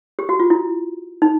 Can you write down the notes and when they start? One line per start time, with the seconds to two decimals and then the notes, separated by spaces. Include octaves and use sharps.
0.19 G4
0.29 F#4
0.39 F4
0.50 E4
1.22 D#4